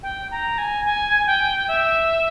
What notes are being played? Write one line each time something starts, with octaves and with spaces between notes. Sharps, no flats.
G5
A#5
G#5
G#5
G5
E5